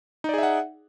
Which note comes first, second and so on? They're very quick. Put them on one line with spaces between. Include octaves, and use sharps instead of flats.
D#4 D5 G#4 E5 F#5